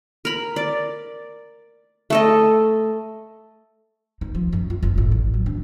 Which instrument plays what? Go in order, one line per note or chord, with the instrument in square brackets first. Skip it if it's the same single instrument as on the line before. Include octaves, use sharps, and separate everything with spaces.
[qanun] A#4 B5
D5
A3 A4 D#5
[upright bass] D#4
F3
F#2
F4
F#1
A2
A1
F#3
D4